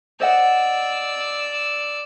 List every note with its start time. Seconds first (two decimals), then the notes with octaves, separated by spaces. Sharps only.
0.20 C5 D5 D#5 F#5 E6